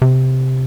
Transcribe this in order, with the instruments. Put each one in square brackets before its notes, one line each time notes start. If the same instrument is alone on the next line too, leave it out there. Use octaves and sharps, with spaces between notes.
[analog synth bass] C3